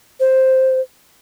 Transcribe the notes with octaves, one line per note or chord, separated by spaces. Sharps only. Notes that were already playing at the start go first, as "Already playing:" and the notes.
C5